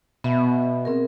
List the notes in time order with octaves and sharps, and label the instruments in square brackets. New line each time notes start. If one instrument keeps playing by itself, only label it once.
[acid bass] B2 [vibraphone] B3 E5 B5
[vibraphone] C4 G#4 A#4